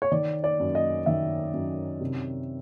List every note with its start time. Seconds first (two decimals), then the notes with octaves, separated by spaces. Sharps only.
0.02 C#5
0.12 D#3 D5
0.44 D5
0.60 F#2
0.75 D#5
1.06 D#3 E5
1.53 F#2
2.01 C3